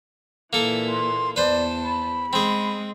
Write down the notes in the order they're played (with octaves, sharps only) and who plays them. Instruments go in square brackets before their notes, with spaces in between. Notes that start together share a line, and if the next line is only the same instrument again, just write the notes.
[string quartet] A#2 E3 [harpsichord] A#3 A4
[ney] C6
[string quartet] E2 A5 [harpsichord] B4 C5 [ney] D5
[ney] B5
[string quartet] G#3 [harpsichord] C4 G#4